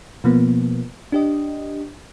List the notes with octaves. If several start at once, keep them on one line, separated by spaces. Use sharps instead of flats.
B2 F3 A#3 B3
D4 G4 D#5